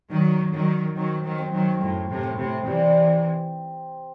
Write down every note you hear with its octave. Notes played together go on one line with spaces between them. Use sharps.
D#3 F#3 D#4
D#3 F#3 D#4
D#3 F#3 C4
D#3 F#3
C4
D#3 F#3
F#2 A2 C4
A2 C3
C4
A2 C3
C3 E3 G3